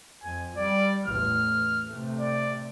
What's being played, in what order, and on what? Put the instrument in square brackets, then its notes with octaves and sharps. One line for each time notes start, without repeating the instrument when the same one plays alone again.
[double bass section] F2 [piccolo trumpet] G#5
[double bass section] G3 [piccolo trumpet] D5
[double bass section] A1 E2 [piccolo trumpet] F6
[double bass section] C3 A3
[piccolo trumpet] D5